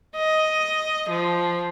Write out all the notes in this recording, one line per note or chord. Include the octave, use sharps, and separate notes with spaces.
D#5
F3